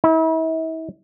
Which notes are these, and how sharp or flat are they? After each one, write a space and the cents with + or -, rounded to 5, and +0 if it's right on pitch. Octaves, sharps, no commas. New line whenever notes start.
E4 -40